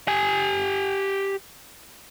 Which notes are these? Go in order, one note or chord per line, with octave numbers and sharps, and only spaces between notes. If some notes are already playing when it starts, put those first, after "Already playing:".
G4 G#5